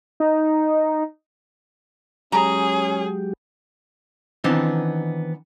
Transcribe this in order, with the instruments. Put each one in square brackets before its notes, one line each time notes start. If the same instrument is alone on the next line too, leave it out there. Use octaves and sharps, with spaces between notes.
[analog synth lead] D#4
[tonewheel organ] F#3 G#3 G4 [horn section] C#4 [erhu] G#4 [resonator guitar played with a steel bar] A#5
[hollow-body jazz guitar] D#3 E3 B3 C4 D4 D#4